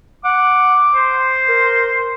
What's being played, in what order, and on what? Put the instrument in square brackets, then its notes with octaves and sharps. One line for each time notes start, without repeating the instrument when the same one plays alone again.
[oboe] F#5 [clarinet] D6
[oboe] C5
[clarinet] A#4